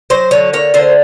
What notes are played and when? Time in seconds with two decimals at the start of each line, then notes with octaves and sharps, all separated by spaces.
0.10 F#3 C5
0.31 D3 C#5
0.53 A#3 C#5
0.74 D3 C5